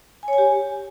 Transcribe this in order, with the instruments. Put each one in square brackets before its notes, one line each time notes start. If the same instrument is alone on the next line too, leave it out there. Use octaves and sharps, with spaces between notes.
[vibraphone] G#5
C#5
G#5
G4